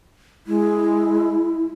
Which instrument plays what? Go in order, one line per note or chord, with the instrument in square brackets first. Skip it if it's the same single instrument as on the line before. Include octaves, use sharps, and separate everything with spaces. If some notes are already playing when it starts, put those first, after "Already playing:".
[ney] G#3 [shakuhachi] E4